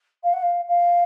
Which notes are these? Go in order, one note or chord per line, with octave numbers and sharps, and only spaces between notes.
F5
F#5
F5
F5